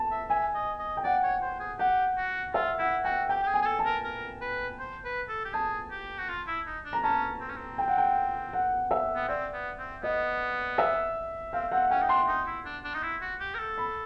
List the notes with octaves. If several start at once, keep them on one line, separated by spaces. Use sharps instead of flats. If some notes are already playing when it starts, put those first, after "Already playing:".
Already playing: A5
E5
E5 G#5
D#5
D#5
G5
D5 F#5
C#5
C5
G#4
G4 F#5
F#4
F4 E5
E4 F#5
F#4 G5
G4 G5
G4
G#4
G#5
G#4
A4
A5
A#4
A#4
B4
C5
B4
A4
G4
G#4 A5
G4
F#4
F4
E4
D#4
D4
A#5
C#4 A5
C4
C#4
C4
G5
F#5
G5
F#5
E5
B3
C4 D5
B3
C4
B3 D#5
E5
C4 F5
C4 F#5
C#4 G5
D#4
D4 C6
D#4
E4
D4
D4
D#4
E4
F#4
G4
A#4
A4
B5